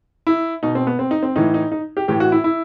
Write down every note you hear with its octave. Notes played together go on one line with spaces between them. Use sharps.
E4
B2 D#4
C4
B3
C4
D#4
C4
A2 E3 D#4
D#4
D#4
G4
A2 E3 G4
F#4
E4
E4